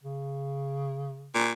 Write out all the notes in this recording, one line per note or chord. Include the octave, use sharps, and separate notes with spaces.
C#3
A#2